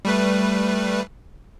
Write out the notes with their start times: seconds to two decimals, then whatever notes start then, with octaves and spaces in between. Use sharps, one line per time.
0.05 G3 A3 B4